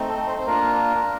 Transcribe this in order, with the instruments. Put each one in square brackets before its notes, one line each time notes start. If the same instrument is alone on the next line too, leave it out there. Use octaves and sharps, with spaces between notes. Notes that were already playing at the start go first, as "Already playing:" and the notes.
Already playing: [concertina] A3 C4 D#4
A4
C5
C5
A#3 D4 F4 A#4
A#3